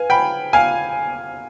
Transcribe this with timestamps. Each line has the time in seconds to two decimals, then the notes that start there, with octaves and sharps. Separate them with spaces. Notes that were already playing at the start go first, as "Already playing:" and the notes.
Already playing: B4 F5 G#5
0.10 G5 B5
0.53 F5 G#5